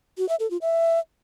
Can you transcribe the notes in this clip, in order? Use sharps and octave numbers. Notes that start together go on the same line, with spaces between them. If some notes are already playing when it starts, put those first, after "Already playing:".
F#4
E5
A4
F4
E5